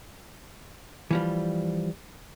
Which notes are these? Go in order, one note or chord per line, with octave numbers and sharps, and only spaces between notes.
E3 F3 G3